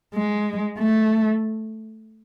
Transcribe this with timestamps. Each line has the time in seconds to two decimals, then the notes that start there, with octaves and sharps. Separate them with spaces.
0.14 G#3
0.79 A3